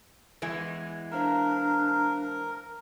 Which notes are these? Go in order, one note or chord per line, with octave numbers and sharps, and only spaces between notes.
E2 E3 G#3
D4 A#4 C5 F5 A#5